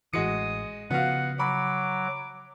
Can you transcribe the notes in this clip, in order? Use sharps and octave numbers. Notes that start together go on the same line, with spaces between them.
A1 E3 G#3 F#4 D#6 C#7
C#3 F3 B3 F#4 F5 F#5
F#3 B5 D6